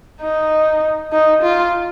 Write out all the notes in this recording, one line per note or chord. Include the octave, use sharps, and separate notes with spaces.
D#4
D#4
F4